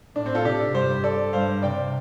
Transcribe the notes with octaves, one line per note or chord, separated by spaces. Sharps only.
A2 D4
C4
F4 A4
C3 D4 G4
G2 G4 C5
A4 D5
G2 C5 F5
C3 D5 G5